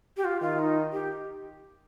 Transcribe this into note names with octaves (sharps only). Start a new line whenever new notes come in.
G4
F4
D#3 F4
D#4
G4